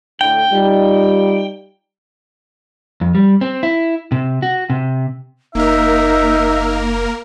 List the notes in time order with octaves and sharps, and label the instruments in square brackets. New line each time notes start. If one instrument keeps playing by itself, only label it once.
[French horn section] A2 D3 [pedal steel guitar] G5
[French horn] G3 [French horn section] D#4 F4 D5
[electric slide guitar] F2
G3
C4
E4
C3
F#4
C3
[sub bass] F#1 [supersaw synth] A#3 A#4 [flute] D#4 [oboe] E5